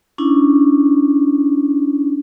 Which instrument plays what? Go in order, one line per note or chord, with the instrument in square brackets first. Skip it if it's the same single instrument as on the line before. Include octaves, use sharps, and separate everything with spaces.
[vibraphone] C#4 D4 E4